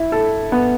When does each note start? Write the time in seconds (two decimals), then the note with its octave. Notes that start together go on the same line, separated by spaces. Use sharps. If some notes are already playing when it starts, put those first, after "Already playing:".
Already playing: E4
0.12 A4
0.52 B3